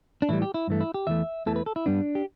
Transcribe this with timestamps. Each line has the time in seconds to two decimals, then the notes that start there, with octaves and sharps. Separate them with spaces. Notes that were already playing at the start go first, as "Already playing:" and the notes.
0.22 D4
0.29 A2 E3 G3 E4
0.42 G4
0.54 E4
0.68 G2 E3 A3
0.81 E4
0.94 G4
1.07 E2 E3 A3 E5
1.46 E2 E3 A3 A4
1.56 B4
1.66 A4
1.76 E4
1.86 G2 G3 B3 D4
2.15 G4